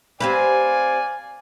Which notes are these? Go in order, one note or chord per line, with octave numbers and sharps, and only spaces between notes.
C4 G4 B4 D5 F5 G#5